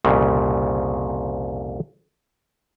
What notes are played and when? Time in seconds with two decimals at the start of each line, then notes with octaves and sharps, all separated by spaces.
0.05 C2 F2 A#2 C#3